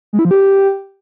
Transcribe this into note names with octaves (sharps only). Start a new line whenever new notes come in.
G#3
E4
F3
G4